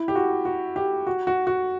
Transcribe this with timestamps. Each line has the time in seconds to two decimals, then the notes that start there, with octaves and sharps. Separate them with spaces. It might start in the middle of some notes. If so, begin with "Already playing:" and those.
Already playing: E4
0.08 G4
0.15 F#4
0.45 F#4
0.76 G4
1.07 F#4
1.27 F#4
1.47 F#4